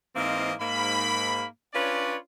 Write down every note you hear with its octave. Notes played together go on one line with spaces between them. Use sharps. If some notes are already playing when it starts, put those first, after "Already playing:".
G#2 E3 A#3 C4 D#5 F5
G#2 A#3 B5
C#4 D4 F4 B4 C#5 D5